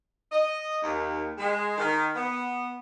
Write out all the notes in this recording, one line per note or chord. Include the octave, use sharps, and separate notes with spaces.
D#5
D#2
G#3
D#3
B3